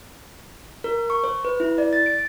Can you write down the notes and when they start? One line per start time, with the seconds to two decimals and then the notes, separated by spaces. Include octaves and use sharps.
0.84 A#4
1.10 C#6
1.24 C5
1.45 B4
1.60 E4
1.78 D5
1.93 A6
2.06 D7